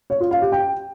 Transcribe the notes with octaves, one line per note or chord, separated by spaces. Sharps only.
C#5
F4
F5
G4
G5